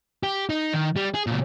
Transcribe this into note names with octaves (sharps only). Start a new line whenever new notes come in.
G4
D#4
D#3
G3
G#4
A#2 C#3